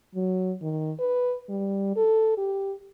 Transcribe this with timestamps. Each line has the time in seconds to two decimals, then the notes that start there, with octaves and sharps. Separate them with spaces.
0.15 F#3
0.62 D#3
0.99 B4
1.49 G3
1.96 A4
2.37 G4